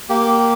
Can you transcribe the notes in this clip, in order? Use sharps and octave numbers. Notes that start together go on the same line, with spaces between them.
A#3 G4